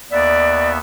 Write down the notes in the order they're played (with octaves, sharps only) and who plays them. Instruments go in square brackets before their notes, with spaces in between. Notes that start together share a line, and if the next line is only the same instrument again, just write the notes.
[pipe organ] D#2 B3 E5 [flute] D5